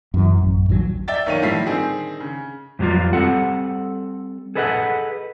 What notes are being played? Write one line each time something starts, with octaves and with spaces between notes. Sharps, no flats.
F#2 E3
A1 F#2
A1 D#2 C3 F#3
D5 E5 G5 A6
B1 D#3 C#5 F5 D#7
A2 F3 G3 E5 B6 C7
D3 D#3 C4 G#4
C#3
F2 A2 F#3 G3 F4
G3 C4 A4 F#5
G#4 A4 B4 D#5 F5 F#5